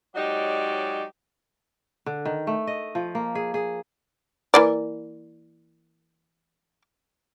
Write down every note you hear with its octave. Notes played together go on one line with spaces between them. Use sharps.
F#3 G#3 D#4 G4 C#5 D5
D3
D#3
A3
D#5
F3
A#3
G#4
G#4
E3 A#3 D5